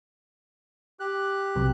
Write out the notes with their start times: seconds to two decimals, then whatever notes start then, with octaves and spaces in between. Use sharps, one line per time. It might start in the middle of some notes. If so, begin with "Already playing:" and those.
1.00 G4 F#6
1.55 B1 C3 F#3